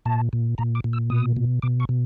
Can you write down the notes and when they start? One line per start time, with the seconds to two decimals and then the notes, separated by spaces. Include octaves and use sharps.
0.06 A#2 A5
0.33 A#2
0.58 A#2 A#5
0.75 D6
0.84 A#2
0.93 E6
1.10 B2 D#6
1.37 B2
1.62 B2 D6
1.80 C#6
1.89 B2